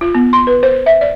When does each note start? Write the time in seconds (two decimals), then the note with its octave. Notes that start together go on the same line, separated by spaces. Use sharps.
0.01 F4
0.15 B3
0.33 C6
0.47 B4
0.63 C5
0.86 E5
1.01 D5